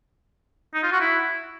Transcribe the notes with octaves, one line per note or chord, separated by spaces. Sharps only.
D#4
F4
F#4
E4